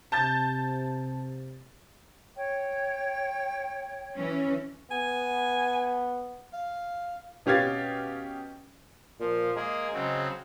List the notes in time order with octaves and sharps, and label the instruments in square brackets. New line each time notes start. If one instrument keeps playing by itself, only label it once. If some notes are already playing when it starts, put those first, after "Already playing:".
[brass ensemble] C3 [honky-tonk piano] A5 G6 A6
[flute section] C#5 G5
[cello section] E3 C#4
[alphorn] B3 [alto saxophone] G#5
[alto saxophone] F5
[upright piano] B2 C#4 G4 F5 G#6 A6
[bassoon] A#2 [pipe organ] F3
[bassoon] G#3 [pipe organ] A#3 G#4
[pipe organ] C#3 F#3 C4